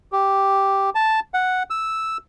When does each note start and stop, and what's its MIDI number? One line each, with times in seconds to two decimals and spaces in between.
0.12 0.90 67
0.95 1.20 81
1.34 1.63 78
1.70 2.17 88